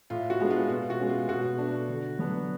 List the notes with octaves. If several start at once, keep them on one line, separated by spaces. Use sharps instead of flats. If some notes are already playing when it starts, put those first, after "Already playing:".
A2 F4
F#4
G#3 B3 D4
F4
B2 F4
F#4
G#3 C#4
F4
B2 F#4
A3 D4
D3
F#3 B3 D4